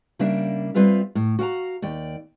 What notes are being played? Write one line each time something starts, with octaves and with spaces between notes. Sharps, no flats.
C#3 G3 A#3 D4 A#4 E5
G3 C4 F4 B4 E5 F5
A2
F#4 F5 G5 A#5
D#2 D5 G5